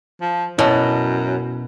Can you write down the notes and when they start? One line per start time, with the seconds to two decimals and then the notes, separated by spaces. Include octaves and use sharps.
0.21 F3
0.59 F#2 B2 E4 C#5 A5